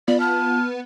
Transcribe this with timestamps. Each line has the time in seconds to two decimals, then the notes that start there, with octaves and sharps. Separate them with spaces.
0.08 B3 F4 D5
0.20 A5 F6